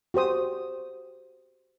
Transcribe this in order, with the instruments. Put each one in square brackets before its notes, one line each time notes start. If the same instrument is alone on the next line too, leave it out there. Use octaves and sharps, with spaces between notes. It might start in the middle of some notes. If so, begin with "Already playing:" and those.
[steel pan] F#4 G4 C5 D#6